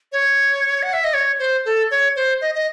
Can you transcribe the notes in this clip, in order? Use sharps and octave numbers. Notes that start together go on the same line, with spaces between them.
C#5
F#5
E5
D#5
C#5
C5
A4
C#5
C5
D#5
D#5